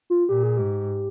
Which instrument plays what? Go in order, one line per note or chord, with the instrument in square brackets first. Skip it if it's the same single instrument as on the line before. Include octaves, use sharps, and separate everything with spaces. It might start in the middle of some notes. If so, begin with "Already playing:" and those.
[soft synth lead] F4
[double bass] A#2 [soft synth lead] G4
[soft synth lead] G#4
[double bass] G#2 [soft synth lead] G4